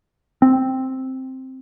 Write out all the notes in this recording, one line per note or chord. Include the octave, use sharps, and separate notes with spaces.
C4